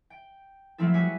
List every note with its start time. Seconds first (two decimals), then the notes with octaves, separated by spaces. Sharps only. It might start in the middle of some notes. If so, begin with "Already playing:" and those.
0.10 G5
0.78 F3 F#3 A3 C4 E4 A4
0.94 G3 F#4 G#4 C#5 B6